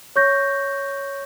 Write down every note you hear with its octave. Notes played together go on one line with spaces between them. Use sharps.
C#5 C#6 G6 A#6